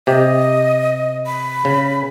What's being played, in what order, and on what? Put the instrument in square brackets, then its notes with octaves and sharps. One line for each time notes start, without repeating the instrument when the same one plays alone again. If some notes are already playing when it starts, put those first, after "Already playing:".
[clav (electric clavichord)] C3 G4 [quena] D#5
[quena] B5
[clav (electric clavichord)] C#3